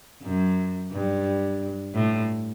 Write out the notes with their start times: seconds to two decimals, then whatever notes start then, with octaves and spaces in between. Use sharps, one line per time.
0.23 F#2
0.91 G2
1.94 A2